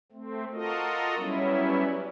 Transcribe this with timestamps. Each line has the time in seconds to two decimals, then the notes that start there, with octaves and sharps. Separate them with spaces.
0.12 A3 C4
0.53 F4 F#4 A4 A#4 D#5
1.16 F#3 G3 B3 C#4 E4